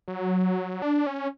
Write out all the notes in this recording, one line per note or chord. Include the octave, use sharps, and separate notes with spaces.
F#3
D4
C#4